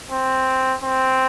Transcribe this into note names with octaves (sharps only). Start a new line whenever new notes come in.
C4
C4